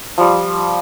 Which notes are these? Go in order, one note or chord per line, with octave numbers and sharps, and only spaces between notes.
F3 G3